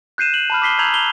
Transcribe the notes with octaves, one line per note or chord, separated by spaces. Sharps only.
F#6 G6 C7 D#7 E7
F#7
A5 B5 F6
D6 D#6 B6 C7 G7
A#5 E6 G6 G#6 F7 F#7
F7 G7